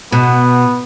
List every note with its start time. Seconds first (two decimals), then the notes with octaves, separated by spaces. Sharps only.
0.12 B2 B3